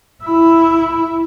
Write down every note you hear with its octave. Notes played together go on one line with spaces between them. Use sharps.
E4